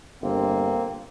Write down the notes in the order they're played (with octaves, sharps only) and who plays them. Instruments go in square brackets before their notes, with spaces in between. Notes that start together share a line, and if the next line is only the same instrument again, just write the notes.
[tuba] G1 [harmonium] A#3 C4